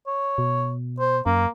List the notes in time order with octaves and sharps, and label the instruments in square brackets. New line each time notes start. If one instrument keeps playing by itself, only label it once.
[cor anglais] C#5
[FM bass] B2
[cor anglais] C5
[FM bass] F#2 [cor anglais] A#3